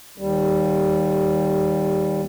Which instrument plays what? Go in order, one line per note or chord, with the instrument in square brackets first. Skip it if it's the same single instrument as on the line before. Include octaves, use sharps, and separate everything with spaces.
[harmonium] D#2 G3